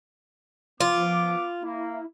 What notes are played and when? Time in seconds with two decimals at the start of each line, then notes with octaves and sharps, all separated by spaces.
0.80 F3 B3 F4 D6
1.63 A#3 E4